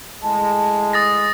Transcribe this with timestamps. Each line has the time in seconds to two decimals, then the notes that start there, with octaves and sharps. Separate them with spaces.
0.23 A2 G#3 A5
0.93 D#6 A6 A#6